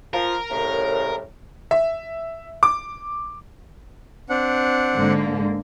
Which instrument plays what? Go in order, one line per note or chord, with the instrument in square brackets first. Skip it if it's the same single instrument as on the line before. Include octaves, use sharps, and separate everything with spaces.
[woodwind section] F3 [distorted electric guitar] A#4
[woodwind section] C2 A2 C#3
[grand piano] E5
D6
[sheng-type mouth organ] C4 D4 F#5
[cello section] G#2 D3 A#3